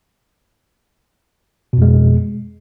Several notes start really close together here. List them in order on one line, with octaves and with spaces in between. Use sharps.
B2 F2 G#3